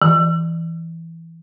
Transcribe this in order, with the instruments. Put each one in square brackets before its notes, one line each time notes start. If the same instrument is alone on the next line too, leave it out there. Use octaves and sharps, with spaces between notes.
[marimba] E3